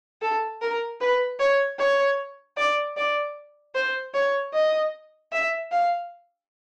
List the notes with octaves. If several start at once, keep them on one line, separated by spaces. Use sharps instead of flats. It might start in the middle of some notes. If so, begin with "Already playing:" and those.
A4
A#4
B4
C#5
C#5
D5
D5
C5
C#5
D#5
E5
F5